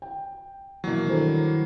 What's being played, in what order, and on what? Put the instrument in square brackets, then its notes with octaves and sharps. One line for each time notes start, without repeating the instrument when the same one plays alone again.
[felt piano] G5
[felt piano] B2 E3 [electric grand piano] F#3 A#3
[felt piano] G2 A4 C5 [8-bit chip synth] D#3 E4